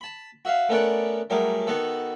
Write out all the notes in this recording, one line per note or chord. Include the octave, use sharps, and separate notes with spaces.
A5 B5
F#4 E5 F5
A3 B3 C#4 A#4 D5 F#5
F#3 G3 A3 G#4 A#4
D#3 B3 F#4 A4